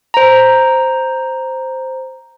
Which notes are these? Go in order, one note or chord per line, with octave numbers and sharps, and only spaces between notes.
C5 A#5